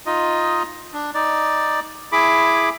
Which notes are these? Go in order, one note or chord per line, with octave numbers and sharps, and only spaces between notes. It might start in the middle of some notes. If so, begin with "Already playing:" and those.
D#4 F4 D#5
D4
D#4 D5
E4 G#4 B5 D6